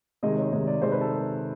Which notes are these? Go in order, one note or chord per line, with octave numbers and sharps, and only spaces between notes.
C3 D#3 G#3 D#5
C#5
C3 D#3 G#3
D5
C3 D#3 G#3 C5
B4
A4